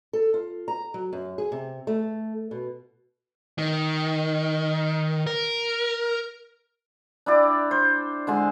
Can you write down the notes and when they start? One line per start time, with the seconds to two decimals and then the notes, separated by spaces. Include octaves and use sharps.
0.13 A4
0.34 F4
0.68 A#5
0.94 F#3
1.13 F#2
1.38 G#4
1.52 C3
1.87 A3
2.51 B2
3.58 D#3
5.27 A#4
7.26 D4 E4 G4 D5
7.71 C5
8.27 D3 G#3 A5 C6